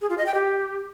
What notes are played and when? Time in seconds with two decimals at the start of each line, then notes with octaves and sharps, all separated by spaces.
0.01 G#4
0.10 F4
0.18 D#5
0.26 G5
0.34 G4